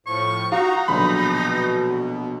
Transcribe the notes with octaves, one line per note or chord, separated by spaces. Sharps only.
A2 F3 C#6
D#4 F4 F#4 A#5
A#1 B2 D3 F#3 B5